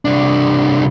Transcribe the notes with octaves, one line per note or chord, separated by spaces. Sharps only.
C2 D4